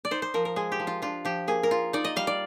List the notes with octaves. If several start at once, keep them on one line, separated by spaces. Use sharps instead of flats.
D5
D#4 C5
C5
F3 A#4
A#4
G#3 G#4
G4
F3
F4
D4 F4
F3 G4
A#3 G#4
A#4
F4
D#4 D5
D#5
G3 F5
D5